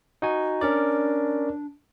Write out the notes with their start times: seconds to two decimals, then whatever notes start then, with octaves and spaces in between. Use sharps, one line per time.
0.22 D#4 F#4 G#5
0.61 C#4 D4 A#4 D5